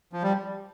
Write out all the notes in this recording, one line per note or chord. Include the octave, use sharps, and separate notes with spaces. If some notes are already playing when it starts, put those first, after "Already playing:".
F3
G3